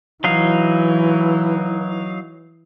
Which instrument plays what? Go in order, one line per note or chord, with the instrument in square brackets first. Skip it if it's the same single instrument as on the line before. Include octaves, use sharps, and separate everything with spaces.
[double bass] E3 [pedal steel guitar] F#3 D#4 F5